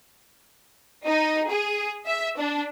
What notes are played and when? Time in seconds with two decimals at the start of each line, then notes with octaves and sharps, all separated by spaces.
1.06 D#4
1.49 G#4
2.07 E5
2.38 D4